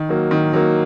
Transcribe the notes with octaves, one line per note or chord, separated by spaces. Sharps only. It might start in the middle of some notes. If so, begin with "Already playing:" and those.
Already playing: D#3
F#3 A#3
D#3
F#3 A#3